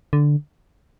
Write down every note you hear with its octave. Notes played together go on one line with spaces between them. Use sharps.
D3